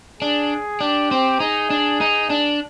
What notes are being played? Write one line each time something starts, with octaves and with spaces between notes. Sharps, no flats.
D4 G#4
D4 G4
C4
D#4 G#4
D4
D#4
D4